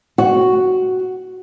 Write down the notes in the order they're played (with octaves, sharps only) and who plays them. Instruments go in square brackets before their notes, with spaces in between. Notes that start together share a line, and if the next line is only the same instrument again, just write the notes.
[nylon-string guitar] F#4